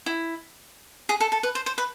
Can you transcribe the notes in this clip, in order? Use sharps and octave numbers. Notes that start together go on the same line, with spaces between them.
E4
G#4
A4
A4
B4
C5
C5
B4